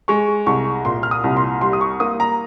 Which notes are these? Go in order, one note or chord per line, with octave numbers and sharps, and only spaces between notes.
G#3 C#6
C2 C#6
A#2 C6
F6
D#6
C2
C6
G3 C6
D#6
C#6
A#3 D#6
A#5